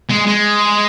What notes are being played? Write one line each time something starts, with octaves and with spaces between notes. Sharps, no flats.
G#3
G#3